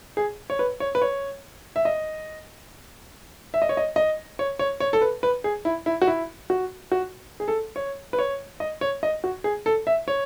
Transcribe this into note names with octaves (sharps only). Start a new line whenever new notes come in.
G#4
C#5
B4
C#5
B4
C#5
E5
D#5
E5
D#5
C#5
D#5
D#5
C#5
C#5
C#5
A4
B4
B4
G#4
E4
E4
F#4
E4
F#4
F#4
G#4
A4
C#5
B4
C#5
D#5
C#5
D#5
F#4
G#4
A4
E5
C#5